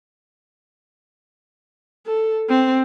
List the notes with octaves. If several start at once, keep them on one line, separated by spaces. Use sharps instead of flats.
A4
C4